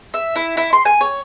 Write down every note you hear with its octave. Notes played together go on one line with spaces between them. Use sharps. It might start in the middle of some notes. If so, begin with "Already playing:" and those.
E5
E4
E4
C6
G#5
C#5